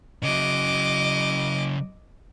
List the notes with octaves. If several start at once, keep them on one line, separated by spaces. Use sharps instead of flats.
C#3 F#3 D#5 D6